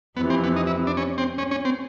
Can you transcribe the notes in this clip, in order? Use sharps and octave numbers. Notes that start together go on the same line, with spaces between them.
F2 C3 E3 B3
C4
B3
D#4
E4
D4
C#4
C4
C#4
C#4
C4